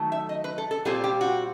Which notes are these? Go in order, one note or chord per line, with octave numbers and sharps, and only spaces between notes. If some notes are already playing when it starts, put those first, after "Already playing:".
Already playing: D#3 F#3 A3
E5
D#5
B4
A4
A4
A#2 G3 C4 F4 G#4
G4
F#4